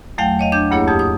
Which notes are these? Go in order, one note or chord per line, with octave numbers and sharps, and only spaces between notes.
E2 F#3 A3 F5 G5
C#5 D#5 F5
D4 G6 G#6
D2 G2 A#3 E4 G#4 C#5
F2 G4 D#6
D#6